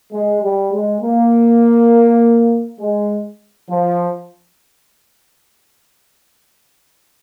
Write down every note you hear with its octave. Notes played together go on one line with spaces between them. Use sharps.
G#3
G3
G#3
A#3
G#3
F3